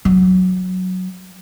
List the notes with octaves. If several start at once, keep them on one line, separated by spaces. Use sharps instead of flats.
F#3